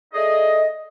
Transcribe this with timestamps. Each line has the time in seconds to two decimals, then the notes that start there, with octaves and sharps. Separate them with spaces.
0.14 A3 G#4 D5 D#5